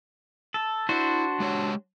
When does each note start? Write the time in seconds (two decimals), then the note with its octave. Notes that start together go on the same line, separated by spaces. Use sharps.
0.54 A4
0.89 D4 E4 F#4 C5
1.40 G#3 G4 C#5